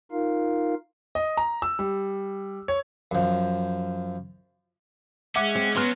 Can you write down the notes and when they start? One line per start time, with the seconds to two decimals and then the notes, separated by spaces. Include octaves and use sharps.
0.11 D#4 F4 A#4 F5
1.15 D#5
1.37 A#5
1.62 E6
1.79 G3
2.68 C#5
3.11 F#2 F3
5.36 G#3 C#4 E5 F#5 D6
5.55 C4
5.76 F#3 B3 C#4 B4 C6 F6